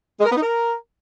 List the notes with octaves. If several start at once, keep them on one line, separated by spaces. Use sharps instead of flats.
G#3
A#4
B3
D#4
A#4